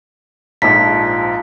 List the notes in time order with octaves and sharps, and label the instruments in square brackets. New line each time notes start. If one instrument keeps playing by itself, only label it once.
[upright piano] A#1 G#2 [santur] F3 A4 [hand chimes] B6